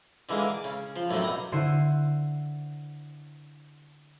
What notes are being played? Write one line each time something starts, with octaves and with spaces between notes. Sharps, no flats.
D3 E3 G#3 A#3 G#4
D6
C#3
F3 C6
F#2 A2 D3 F#3 C4
B1 A#5
D3 E4 C5 D#7